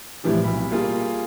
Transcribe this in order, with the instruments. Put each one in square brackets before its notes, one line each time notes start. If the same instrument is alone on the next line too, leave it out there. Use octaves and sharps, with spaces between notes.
[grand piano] A2 C3 E3 F3 G3
B1 B5
G3 A#3 F4 G#4